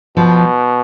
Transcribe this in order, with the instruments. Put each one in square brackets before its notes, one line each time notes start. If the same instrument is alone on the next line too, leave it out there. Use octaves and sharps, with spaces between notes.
[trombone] B2 [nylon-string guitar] F3